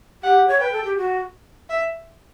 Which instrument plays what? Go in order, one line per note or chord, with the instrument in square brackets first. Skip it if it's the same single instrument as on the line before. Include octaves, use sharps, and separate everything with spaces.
[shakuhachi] G4 [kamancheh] F#5
[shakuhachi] C#5
[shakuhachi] B4 [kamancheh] G5
[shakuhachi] A4
G4
F#4
[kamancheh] E5